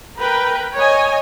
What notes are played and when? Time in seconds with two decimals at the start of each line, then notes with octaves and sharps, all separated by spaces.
0.18 A#4 B4 G5
0.74 C#5 D#5 G#5